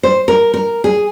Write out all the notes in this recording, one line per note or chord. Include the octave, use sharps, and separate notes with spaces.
C5
A#4
A#4
G#4